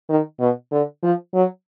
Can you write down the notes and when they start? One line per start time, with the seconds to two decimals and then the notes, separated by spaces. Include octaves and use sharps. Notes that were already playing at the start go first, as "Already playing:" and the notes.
0.09 D#3
0.40 B2
0.72 D3
1.03 F3
1.34 F#3